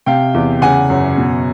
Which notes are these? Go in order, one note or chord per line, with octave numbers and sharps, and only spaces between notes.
C3 F5 G5
E2
C#3 F#5 G#5
F#2
B2